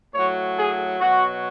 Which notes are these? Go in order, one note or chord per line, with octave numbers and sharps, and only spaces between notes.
A2 F#3 C#5
G#4
B2 F#3 F#4